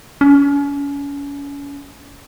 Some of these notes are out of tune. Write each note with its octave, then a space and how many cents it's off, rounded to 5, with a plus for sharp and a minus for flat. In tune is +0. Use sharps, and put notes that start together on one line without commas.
C#4 +35